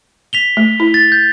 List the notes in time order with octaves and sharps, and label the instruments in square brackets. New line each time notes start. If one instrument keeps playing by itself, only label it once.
[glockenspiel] B6 F7 G7
[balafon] A3
E4
[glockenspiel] A6
G6